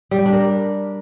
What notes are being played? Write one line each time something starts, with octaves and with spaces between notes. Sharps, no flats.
G3
G4
D4
A#4